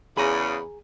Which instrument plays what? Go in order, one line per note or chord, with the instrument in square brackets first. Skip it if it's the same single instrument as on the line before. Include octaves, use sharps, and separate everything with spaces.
[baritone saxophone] E2 [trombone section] C#3 [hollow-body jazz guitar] G#4 G#5 A#5 [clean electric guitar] B5